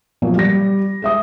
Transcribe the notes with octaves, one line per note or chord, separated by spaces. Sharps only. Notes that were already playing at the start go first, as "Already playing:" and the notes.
A#2 F3 F#3 B3
G3 A#6
G#3 E5 D#6